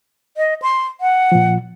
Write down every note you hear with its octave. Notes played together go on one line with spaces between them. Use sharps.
D#5
C6
F#5
A#2 F3